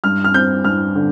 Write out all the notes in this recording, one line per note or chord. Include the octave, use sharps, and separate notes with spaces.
G2 F6
F6
C4 G6
G2 F6
D3